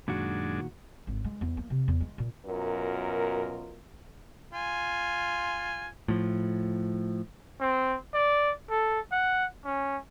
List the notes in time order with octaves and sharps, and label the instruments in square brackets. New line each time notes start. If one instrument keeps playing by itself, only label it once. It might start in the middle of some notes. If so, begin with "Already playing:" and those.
[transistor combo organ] F#2 G#3 D4 [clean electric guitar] A#2 D#3 F#4
[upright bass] G#1
G#3
E2
A#3
C3
E2
G#3
A#2
[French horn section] F#2 B2 F4 A#4
[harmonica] F4 G#5
[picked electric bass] A2 F3
[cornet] C4
D5
A4
F#5
C#4